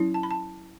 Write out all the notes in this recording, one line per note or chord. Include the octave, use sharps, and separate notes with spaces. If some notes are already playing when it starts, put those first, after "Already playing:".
Already playing: F#3 C#4 E4
A5
B5
A5